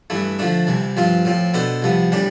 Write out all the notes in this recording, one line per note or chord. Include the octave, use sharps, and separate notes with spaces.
G2 E3 A3 E4
D3 F3 A3 D4
C2 C3 E3
G2 F3 C4 F4
A2 F3 C4
B2 B3 D4 A4 C5
C2 C3 F3 B3
A2 E3 G3 D4 G4